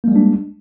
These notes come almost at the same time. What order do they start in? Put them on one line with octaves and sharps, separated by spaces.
A#3 G#3 G3 D4